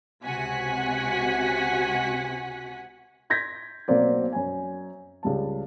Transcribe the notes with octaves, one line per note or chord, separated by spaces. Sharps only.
C#2 C3 F#4 F#5 G#5 B6
C6 G6 G#6 A#6 B6
B1 F#3 A#3 C4 D5
F#2 G#5
C#2 G3 A5